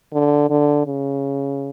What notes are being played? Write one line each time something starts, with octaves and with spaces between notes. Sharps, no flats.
D3
D3
C#3